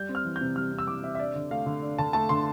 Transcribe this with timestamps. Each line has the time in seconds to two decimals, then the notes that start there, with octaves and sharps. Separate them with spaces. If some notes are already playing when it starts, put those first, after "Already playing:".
Already playing: G3 G6
0.09 C4
0.15 F6
0.25 E3
0.36 G6
0.41 C3
0.56 G3 F6
0.72 C4
0.79 E6
0.87 E3 D6
1.03 C3 E5
1.15 E5
1.19 D4 D5
1.35 D3
1.51 A3 F5
1.66 D3
1.82 D4
1.98 D3 A5
2.13 A3 A5
2.29 D3 C6